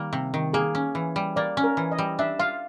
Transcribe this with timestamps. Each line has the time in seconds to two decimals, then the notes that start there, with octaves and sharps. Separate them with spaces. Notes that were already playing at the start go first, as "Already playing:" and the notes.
Already playing: D#3 G3 A#3
0.13 C3
0.34 D#3
0.53 A#3 G#4
0.75 C#4
0.95 E3
1.16 G3
1.36 A#3 D5
1.57 C#4
1.64 A#4
1.77 E3
1.92 D#5
1.98 G3
2.19 D4 E5
2.39 F4 F5